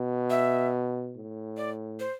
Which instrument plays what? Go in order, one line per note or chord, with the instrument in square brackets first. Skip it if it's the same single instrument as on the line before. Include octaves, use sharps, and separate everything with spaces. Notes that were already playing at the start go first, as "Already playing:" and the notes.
Already playing: [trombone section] B2
[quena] E5
[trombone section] A2
[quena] D5
C5